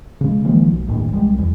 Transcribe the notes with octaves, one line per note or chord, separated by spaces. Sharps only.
C#3 G#3
D#3 F3 G#3 A#3
B1
G1 D#2 A2
C2 G3 G#3
E2